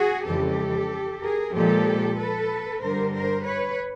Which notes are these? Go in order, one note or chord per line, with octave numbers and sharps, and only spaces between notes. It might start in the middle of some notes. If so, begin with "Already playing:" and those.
Already playing: F#4 G#4
F2 C#3 E3 G#3 G4 A4
G#4 A#4
A#2 F3 G#3 G4 A4
A4 B4
G2 D3 G3 A#4 C5
A#4 C5
B4 C#5